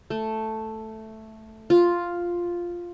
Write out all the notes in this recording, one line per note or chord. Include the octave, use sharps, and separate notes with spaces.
A3
F4